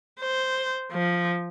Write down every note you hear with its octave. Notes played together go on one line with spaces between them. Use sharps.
C5
F3